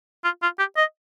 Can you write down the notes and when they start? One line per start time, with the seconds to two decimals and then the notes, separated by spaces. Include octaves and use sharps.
0.24 F4
0.43 F4
0.59 G4
0.77 D#5